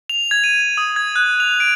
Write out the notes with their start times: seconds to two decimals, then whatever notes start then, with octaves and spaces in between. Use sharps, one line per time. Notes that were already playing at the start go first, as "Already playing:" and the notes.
0.10 F7
0.31 G#6
0.44 D#7
0.78 D#6
0.96 G#6
1.16 F#6
1.40 F7
1.60 D7